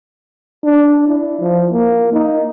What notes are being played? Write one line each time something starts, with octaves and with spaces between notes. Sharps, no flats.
D4
E4
F3
A#3
D#4